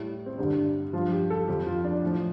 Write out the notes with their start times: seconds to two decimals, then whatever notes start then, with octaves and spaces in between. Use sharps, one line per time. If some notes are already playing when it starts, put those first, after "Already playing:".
Already playing: A2 G3
0.26 C4
0.38 G2 D3 G3 D4
0.93 G2 F3 F4
1.12 G4
1.30 A4
1.48 F2 F3 G4
1.66 F4
1.84 D4
2.02 A2 F3